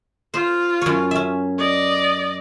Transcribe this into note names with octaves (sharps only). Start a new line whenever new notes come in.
F4 C5
F#2 C#5
C#4 E5
D5 D#5